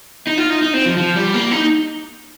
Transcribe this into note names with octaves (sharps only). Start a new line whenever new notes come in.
D#4
F4
D#4
D#4
C4
F3
F3
G3
A#3
D#4